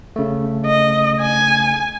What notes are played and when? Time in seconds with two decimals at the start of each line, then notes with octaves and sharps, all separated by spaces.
0.16 C#3 A3
0.66 D#5
1.21 G#5